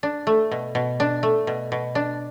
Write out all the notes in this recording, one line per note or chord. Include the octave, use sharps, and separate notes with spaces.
D4
A3
B2
B2
D4
A3
B2
B2
D4